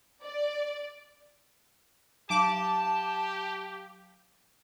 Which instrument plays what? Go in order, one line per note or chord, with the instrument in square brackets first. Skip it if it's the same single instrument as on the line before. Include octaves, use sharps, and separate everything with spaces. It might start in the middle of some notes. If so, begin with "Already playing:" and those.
[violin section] D5
[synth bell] F#3 F5 F#7 [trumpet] G4 [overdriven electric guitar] A5 [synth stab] D6